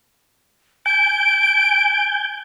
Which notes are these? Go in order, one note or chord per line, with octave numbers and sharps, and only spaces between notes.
G#5 G6 D7